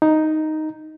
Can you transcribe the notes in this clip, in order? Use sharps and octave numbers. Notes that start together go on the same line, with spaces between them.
D#4